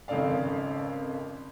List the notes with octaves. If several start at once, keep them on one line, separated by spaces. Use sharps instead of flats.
G#1 F2 C#3 A4 D5 F5